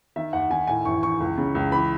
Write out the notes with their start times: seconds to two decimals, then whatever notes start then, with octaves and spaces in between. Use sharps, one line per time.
0.16 D#3 E5
0.33 D#2 F#5
0.50 D#3 G#5
0.67 A2 G#5
0.85 A1 C#6
1.03 E3 C#6
1.20 C#2
1.38 C#3
1.55 C#2
1.72 E3 B5